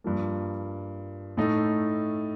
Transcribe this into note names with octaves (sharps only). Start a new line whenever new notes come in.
G2 F3 A#3
A2 A3 D#4